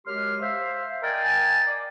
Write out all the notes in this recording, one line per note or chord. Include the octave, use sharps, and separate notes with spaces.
F#2 G#3 G4 C6 F6
C5 E5 F5
A#4 D5 D#5 F5 G5 G#5
D5